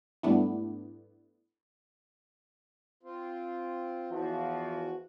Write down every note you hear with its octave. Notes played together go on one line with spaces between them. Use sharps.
G#2 G3 A3 B3 D4 E4
C4 F4
E2 E3 F3 F#4